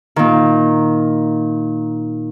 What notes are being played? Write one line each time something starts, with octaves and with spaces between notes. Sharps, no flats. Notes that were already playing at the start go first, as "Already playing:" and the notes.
A#2 D#3